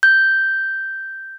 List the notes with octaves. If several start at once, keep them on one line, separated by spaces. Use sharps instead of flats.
G6